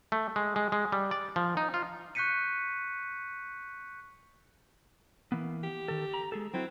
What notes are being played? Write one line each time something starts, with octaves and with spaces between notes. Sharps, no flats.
A3
G#3
G#3
G#3
G3
D5
F3
D#4
F4
C#6 F#6 G6 B6 C#7 D#7
E3 A#3 B3
G4
D#3 A4
A#5
G#3 G#4 A4
F#3 C4 E4 F#4